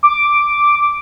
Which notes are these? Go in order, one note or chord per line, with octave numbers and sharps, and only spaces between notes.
D6